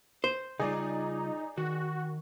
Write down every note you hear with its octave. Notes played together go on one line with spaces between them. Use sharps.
C5
C#3 G3 D#4 F4 G#4 D5
D#3 F#4